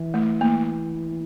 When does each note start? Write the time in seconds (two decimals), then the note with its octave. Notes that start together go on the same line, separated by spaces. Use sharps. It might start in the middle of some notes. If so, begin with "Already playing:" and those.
Already playing: E3
0.14 A3
0.41 A#3